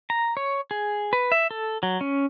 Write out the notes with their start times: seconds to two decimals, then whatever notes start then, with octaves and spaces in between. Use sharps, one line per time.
0.10 A#5
0.37 C#5
0.71 G#4
1.13 B4
1.32 E5
1.51 A4
1.83 F#3
2.01 C#4